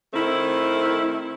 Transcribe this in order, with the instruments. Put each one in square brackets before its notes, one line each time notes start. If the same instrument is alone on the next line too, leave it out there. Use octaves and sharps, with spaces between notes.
[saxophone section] D#3 A3 C4 E4